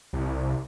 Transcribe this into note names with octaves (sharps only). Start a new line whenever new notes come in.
C2